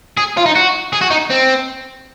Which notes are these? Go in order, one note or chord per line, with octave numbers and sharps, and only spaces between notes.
G#4
F4
D#4
F#4
G#4
F#4
D#4
C4